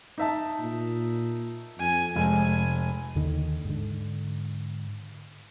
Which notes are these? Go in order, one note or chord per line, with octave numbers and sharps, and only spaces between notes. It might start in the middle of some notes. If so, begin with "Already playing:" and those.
D#4 E5 A5
A#2
F2 G#5
F1 G#3 G#5
D#2 D3 D#3
G#2 D3